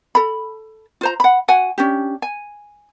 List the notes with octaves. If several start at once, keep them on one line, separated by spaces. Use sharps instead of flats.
A4 B5
F4 C5 A#5
F#5 B5
F#4 F#5 G#5
C#4 D4 G4
G#5